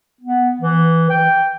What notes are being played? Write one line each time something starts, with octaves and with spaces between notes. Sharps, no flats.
B3
E3
G5